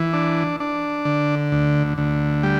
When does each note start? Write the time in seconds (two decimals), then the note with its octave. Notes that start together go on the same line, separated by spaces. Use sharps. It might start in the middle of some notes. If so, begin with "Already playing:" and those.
Already playing: E3
0.13 D4
0.60 D4
1.05 D3
1.52 D2
1.98 D2
2.43 G3